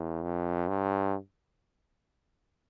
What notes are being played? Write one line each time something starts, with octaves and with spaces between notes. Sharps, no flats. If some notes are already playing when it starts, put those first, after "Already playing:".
Already playing: E2
F2
G2